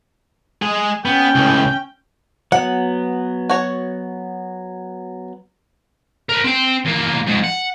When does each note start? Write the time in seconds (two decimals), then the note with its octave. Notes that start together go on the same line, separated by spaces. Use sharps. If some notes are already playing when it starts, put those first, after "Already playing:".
0.62 G#3 G#4
1.05 B3 C#4 G5
1.35 C#2 A2
2.52 F#3 B3 F#5
3.50 F#4 C#5
6.29 A#4 B4
6.44 C4 G5
6.86 E2 A#3
7.26 F2 G#2
7.43 F#5